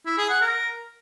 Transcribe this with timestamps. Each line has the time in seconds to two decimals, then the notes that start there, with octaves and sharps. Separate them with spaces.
0.06 E4
0.18 G#4
0.30 F#5
0.41 A#4